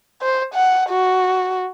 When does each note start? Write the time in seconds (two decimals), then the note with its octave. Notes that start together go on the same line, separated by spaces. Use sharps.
0.22 C5
0.54 F#5
0.89 F#4